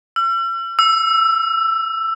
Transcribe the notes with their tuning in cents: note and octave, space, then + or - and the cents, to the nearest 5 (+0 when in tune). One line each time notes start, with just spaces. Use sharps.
E6 +45
E6 +10